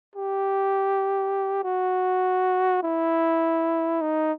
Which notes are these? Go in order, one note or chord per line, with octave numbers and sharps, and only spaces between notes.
G4
F#4
E4
D#4